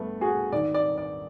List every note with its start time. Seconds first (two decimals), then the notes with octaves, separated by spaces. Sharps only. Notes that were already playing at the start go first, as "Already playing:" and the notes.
Already playing: G2 D3 A3 B3
0.21 F#4 G#4
0.52 G#2 D#3 D5
0.74 D5
0.98 D5